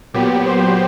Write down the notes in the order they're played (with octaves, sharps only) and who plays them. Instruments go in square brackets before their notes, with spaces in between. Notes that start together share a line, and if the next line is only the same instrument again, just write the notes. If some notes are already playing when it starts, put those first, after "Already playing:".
[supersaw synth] A#2 F#3 B3 G4
C5